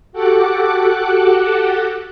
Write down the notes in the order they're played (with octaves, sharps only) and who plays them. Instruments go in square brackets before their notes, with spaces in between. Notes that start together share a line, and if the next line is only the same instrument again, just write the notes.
[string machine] F#4 G4 A4 F#5 D6 F#6